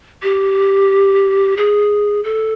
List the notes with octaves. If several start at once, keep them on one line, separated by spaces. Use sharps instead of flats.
G4
G#4
A4